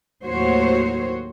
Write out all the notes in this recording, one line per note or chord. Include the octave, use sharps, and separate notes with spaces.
D#2 A2 F#3 F#4 C5 C#5